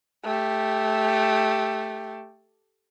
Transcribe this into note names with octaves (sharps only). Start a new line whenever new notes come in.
A3 G4